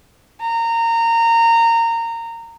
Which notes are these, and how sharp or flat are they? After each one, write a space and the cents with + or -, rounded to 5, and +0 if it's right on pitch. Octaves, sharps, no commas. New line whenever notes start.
A#5 -20